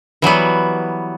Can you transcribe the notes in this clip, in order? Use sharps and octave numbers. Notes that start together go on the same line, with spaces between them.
E3 F#3 G3 B3